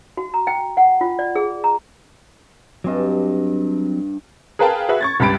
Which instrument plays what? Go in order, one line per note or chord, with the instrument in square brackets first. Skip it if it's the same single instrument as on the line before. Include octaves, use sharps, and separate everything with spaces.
[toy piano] F#4
A#5
G5
F#5
F4
D5
G#4
A#5
[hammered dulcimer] G2 A5 D6 [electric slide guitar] F#3 C4 D#5
[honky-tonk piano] G#4 A#4 B4 F5 G5 A5
F#4 G#4 B4 E5
C#6 G#6 A6
C#2 G2 G4 B5 A6 D7